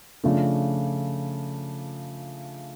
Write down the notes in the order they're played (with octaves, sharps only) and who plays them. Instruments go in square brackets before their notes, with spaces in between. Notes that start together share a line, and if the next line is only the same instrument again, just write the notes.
[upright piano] C#3 F3 A3 D4